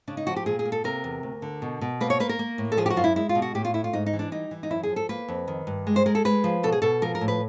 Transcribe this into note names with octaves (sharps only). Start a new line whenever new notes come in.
C#3 D4
D#4
F3 F#4
G4
A#2 G#4
G#4
A#3
A4
C3 A#4
E2
D2
D3
B2
B2
A#3 B4
C#5
A#3 B4
A#4
A#3
A2
A4
F3 G#4
G4
F#4
F#2 F4
E4
G#3 E4
F4
B2
F#4
A2 G4
F4
A3 E4
F4
G#2 D#4
D#4
E3
D4
G3 D#4
E3
D#4
F#2 E4
G#4
F3
A4
A#3 B4
F2
D#3
G2
G#3
C5
G#3 A#4
A4
G#3 B4
F3
B2 A4
G#4
B2 A4
F3 A#4
A#4
A2
B4